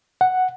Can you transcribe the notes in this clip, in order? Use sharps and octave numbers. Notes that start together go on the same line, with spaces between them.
F#5